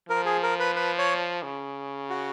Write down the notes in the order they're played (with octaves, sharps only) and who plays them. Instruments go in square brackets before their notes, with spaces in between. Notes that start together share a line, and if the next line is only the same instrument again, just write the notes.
[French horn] F3 [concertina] A#4
[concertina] G#4
A#4
B4
B4
C#5
[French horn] C#3
[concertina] F#4